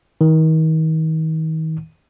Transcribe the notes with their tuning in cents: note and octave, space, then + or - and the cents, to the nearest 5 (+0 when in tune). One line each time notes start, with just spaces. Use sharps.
D#3 +35